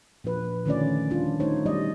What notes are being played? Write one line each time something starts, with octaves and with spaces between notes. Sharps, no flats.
A#2 F3 D4 B4
D3 D#3 A3 C#4 F4 D5
D#3 G3 C#4 D4 F4
A3 D#4 C5 C#5
B2 F#3 G3 D5 D#5